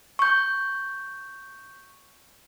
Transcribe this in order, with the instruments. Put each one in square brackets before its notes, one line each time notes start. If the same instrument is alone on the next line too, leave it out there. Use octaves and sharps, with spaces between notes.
[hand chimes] C#6 G6